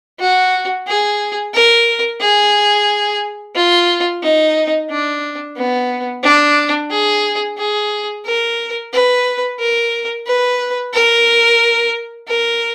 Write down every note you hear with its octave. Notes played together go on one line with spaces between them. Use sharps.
F#4
G#4
A#4
G#4
F4
D#4
D4
B3
D4
G#4
G#4
A#4
B4
A#4
B4
A#4
A#4